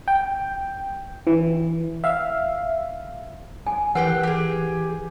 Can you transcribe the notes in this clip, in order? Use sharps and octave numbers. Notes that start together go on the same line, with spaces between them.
G5
E3
E5 F5
G#5
E3 G4 A#4 B4 F#5 G5 F#6
G4 G#4